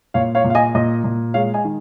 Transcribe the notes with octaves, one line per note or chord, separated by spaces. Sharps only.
A#2 C#5 F5
C#5 F5
A#2
F5
D#5 G#5
A#2 D#5
A#2
G#3 C#5 F5
D#5 G#5
D#3